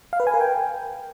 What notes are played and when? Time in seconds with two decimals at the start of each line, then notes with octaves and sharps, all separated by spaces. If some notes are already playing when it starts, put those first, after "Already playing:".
0.13 F5
0.20 B4
0.27 G#5
0.34 A#4
0.41 G5